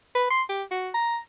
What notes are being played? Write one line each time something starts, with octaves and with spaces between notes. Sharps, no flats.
B4
C6
G4
F#4
A#5